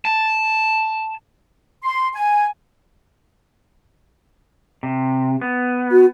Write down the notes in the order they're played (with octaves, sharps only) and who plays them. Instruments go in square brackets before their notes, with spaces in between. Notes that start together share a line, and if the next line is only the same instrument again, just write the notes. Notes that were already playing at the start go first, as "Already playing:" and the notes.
[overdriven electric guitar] A5
[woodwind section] C6
G#5
[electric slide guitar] C3
B3
[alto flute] F#4